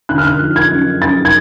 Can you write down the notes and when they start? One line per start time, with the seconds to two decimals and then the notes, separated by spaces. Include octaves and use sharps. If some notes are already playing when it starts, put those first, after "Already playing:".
0.09 D3 F#6
0.18 F6
0.27 F#6
0.41 F3
0.56 G#6
0.71 F#2
1.02 F#2 A6
1.25 G#6